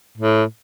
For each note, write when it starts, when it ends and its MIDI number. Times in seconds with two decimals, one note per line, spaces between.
0.18 0.44 45